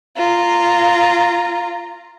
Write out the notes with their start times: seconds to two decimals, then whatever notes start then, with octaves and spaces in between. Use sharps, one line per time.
0.17 F4 A#5